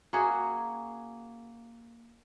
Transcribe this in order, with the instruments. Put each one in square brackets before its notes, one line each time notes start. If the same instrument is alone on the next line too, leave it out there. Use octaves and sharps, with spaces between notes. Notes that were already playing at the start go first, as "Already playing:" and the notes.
[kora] A#3 C#4 F#4 G#4